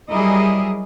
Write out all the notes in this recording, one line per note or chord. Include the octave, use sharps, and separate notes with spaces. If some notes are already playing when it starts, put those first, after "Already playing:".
F#3 G3 E4 G#4 A#4 D#5